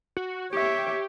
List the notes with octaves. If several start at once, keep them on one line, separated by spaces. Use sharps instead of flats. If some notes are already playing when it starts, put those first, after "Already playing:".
F#4
G4 C#5 E5